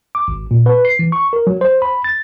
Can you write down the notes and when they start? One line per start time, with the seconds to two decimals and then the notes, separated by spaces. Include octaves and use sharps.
0.15 D6
0.28 G#1
0.51 A#2
0.66 B4
0.85 C7
0.99 E3
1.12 C#6
1.33 A#4
1.47 F#3
1.61 C5
1.82 B5
2.04 A6